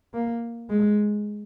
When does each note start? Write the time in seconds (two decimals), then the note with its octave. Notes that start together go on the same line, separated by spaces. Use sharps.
0.14 A#3
0.69 G#3